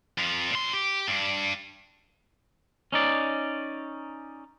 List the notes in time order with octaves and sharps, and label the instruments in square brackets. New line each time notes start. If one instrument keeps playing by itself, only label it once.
[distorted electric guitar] F2 F3
A#2 C6
G4
G2 D4
[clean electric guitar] C#4 D#4 D5